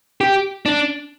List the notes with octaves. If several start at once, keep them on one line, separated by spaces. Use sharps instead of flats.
G4
D4